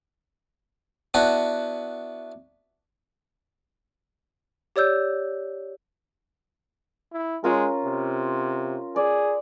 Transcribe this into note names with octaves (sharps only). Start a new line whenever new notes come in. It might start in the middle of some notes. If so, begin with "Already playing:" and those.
B3 D4 E4 F#4 B4
G4 C#5 D5 E6 G6
E4
G#3 C#4 F4 A#4
C3
G#4 D5